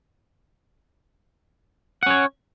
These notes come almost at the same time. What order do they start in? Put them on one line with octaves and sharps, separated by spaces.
F#5 C#4 C#5